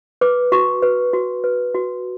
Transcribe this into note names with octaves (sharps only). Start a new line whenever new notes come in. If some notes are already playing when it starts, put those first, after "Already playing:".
B4 D6
F#4 C#6
B4
F#4
B4
F#4